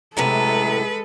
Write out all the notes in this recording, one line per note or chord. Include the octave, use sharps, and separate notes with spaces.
F#2 A2 C3 G#3 A4 B4 A#5